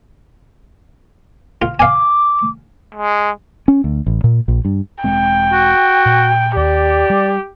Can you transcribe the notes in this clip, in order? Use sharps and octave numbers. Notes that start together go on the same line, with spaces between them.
F4
F5 G#5 D6
G#3
C#4
D2
A1
A#2
A#1
G2
E1 G#3 C4 G5
F#4
A#2
D#2 G4 D5
G3